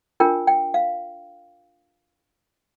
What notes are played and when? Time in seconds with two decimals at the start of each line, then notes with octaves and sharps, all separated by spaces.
0.20 D4 F4 A#4 G5
0.47 G5
0.74 F5